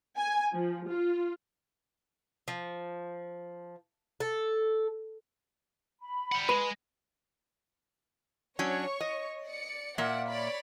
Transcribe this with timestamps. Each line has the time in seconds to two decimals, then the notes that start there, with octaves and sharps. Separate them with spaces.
0.17 G#5
0.54 F3
0.89 F4
2.48 F3
4.20 A4
6.00 B5
6.32 G3 F#5
6.49 G#3 B4
8.59 F#3 C#4 D4 C#5 C#6
9.01 D#5
9.46 D5 C#7
9.98 A#2 A#3 D5 E5 F#5
10.28 C#5 D5 B5